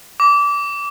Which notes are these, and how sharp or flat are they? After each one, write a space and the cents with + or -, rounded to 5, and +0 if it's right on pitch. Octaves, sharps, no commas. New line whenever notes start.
D6 -25